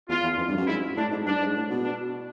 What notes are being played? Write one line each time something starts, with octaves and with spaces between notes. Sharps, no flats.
E2 F4
E2
F2
G2
F#2
G#2 E4
A2 D4
G#2
G2 D4
G#2
A2
B2
D4